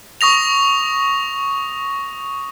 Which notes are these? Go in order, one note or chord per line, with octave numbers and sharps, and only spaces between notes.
C#6 D#6 A#6 F7